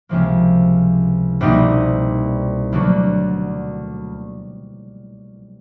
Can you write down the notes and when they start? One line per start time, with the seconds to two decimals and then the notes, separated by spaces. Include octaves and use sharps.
0.09 C#2 C3 F3 A#3
1.41 C2 B2 G3 A#3 D#4
2.72 D2 D3 F#3 A#3